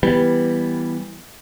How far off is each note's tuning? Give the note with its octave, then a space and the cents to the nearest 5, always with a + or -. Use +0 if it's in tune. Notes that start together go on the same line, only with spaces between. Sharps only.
E3 +0 G3 +0 B3 +0